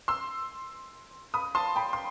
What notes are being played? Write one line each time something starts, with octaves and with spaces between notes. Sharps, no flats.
C6 E6
B5 D#6
A5 C6
G5 B5
C6